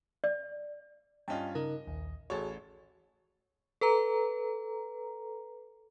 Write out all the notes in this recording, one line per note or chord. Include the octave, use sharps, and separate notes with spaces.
D5
G2 C#4 F4 D#5 G5
C#3 D#4 A#4 D#5
A#1 D#2
A1 F#4 G#4 A4 C#5
A4 B4 A#5